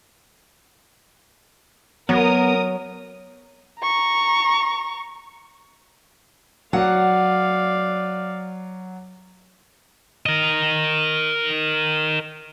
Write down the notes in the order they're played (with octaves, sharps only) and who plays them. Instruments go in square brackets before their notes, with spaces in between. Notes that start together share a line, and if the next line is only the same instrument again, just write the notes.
[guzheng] F#3 [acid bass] B3 [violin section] A#4 D#6
[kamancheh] A#5 C#6
[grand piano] F#3 [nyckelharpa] D5 F5 [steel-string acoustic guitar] F#5
[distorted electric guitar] A#4 D#5